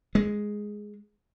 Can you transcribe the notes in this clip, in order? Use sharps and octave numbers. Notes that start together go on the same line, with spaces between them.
G#3